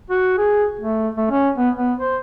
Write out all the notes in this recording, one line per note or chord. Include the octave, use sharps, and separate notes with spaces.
F#4
G#4
A3
A3
C#4
B3
B3
C5